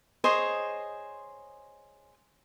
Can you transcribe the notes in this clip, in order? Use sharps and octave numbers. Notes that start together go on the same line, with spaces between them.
G#4 C5 C#5 D#5